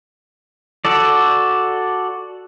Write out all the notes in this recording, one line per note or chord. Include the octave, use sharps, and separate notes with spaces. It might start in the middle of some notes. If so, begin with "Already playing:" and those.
F#4 A4 D5